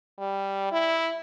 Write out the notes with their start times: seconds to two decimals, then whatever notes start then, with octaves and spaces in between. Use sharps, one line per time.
0.19 G3
0.72 E4